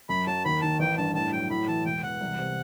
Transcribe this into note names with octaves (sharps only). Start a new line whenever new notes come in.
F#2 B5
F#3 A5
D#2 B5
D#3 A5
A1 G5
G2 A5
A2 A5
F#3 G5
A2 B5
E3 A5
E1 G5
E2 F#5
C2
C3